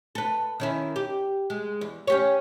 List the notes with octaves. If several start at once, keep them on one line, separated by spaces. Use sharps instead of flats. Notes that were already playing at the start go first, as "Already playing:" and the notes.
A4 B4
D#3 C#4 E4
G4
G#3
E2
C#4 G4 C#5